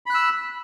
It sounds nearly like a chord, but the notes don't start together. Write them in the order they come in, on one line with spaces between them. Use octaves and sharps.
B5 F#6 E6